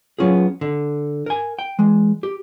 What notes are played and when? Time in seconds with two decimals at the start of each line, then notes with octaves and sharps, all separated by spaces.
0.19 F#3 B3 C#4 F4 G#4
0.61 D3
1.26 A#4 G#5
1.59 G5
1.79 E3 G#3
2.23 G4